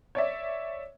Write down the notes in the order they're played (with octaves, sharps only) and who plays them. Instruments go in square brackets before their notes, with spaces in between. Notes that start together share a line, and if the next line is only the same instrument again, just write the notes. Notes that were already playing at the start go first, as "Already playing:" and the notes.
[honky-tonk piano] C#5 D5 E5